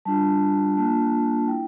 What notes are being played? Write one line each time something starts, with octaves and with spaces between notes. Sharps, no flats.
G3 D4 F4 A5
A#3 D4 F4 A5
E4 G5